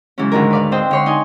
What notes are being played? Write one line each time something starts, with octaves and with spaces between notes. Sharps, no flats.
C#3 E3 F#3 G#3 C#4
D2 G#2 D3 D#3 A#4
B4 D5 F5
C4 D4 C5 D#5 G5
D3 C#5 C6
D#4 D#5 G#5